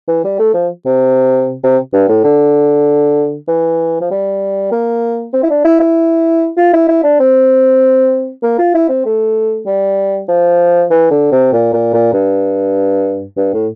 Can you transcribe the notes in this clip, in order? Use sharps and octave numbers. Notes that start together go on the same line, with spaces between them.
E3
G3
A3
F3
C3
C3
G2
A2
D3
E3
F3
G3
A#3
C4
E4
D4
E4
E4
F4
E4
E4
D4
C4
A#3
F4
E4
C4
A3
G3
F3
E3
D3
C3
A#2
A#2
A#2
G2
G2
A2